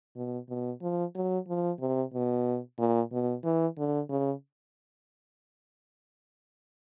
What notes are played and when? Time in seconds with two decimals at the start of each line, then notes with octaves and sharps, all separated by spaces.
0.15 B2
0.49 B2
0.82 F3
1.15 F#3
1.48 F3
1.80 C3
2.13 B2
2.78 A#2
3.12 B2
3.44 E3
3.77 D3
4.10 C#3